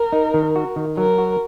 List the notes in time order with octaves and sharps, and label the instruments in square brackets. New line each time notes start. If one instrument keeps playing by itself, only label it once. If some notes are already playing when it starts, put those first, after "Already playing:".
Already playing: [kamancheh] A#4
[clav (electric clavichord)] D#4
D#3
F#4
D#3
[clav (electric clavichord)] F#3 [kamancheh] A#4
[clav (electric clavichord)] F#4